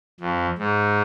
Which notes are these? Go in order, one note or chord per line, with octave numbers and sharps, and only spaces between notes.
F2
G#2